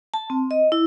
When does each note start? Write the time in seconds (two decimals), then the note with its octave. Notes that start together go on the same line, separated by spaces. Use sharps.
0.14 A5
0.30 C4
0.51 D#5
0.72 E4